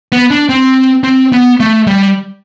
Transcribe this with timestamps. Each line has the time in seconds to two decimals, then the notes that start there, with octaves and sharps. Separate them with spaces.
0.12 B3
0.31 D4
0.49 C4
1.04 C4
1.32 B3
1.60 A3
1.87 G3